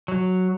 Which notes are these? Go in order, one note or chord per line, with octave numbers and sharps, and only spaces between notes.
F#3